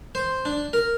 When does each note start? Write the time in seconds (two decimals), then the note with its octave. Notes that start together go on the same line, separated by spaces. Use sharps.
0.15 C5
0.45 D4
0.73 A#4